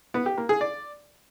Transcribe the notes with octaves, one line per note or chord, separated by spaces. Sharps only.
B3
G4
A#3
G#4
D5